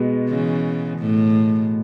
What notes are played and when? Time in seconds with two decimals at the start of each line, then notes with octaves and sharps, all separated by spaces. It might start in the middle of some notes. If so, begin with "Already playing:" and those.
Already playing: B2 G#3 B3
0.28 C#3 E3
0.99 A2